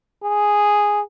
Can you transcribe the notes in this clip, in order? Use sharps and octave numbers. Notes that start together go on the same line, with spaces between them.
G#4